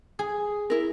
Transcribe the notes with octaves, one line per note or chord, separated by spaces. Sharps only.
G#4
E4 A#4